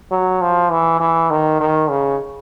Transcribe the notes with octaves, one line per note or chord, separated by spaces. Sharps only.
F#3
F3
E3
E3
D#3
D#3
C#3